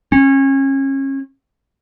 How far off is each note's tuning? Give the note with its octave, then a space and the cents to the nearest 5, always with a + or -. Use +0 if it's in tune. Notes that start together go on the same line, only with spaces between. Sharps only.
C#4 -30